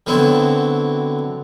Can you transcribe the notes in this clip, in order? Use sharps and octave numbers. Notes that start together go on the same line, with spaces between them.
D3 F#3 B3 C4 E4